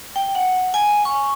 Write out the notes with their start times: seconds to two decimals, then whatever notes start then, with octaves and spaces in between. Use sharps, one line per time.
0.16 G5
0.35 F#5
0.74 G#5
1.05 C#6